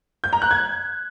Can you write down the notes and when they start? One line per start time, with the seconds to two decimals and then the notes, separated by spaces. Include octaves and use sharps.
0.24 G6
0.33 A#5
0.42 F#6
0.51 G#6